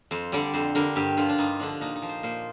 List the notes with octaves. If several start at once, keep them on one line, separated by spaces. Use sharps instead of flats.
F2 C5
D3 G3 D5
F2 C5
D3 G3 A#4
G2 G4
D3 F3 F4
D4
G2 D#4
D3 F3 D4
A#2 D#4
D#4
F3
C5
A#2 C5